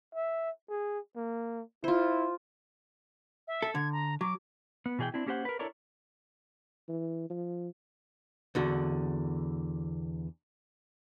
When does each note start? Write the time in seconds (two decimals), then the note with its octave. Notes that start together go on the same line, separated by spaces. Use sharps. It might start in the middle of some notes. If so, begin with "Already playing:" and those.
0.15 E5
0.69 G#4
1.16 A#3
1.84 E4 F4 C5
3.48 E5
3.62 A4
3.75 D3 G#6
3.92 A#5
4.21 F#3 D6
4.86 B3
4.99 B2 E3 G#4 C5 G5
5.14 C4 D4 E4
5.26 A#3 C#4 G4 A4 C5 F#5
5.45 A#4 B4
5.59 D4 E4 A4 A#4 C#5 D5
6.89 E3
7.30 F3
8.55 E2 D3 F#4